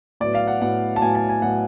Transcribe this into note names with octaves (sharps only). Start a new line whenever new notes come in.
A2 F#3 B3 D5
F5
F#5
A2 F#3 B3 F#5
A5
A2 F#3 B3 G#5
A5
G#5
A2 F#3 B3 F#5